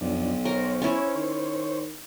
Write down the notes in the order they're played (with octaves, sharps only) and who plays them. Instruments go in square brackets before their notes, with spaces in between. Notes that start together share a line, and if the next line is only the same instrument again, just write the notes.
[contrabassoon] B1 [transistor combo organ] F2 D4
[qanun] A#4 [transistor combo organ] C5 C#5
[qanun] C#4 E4
[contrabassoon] D#3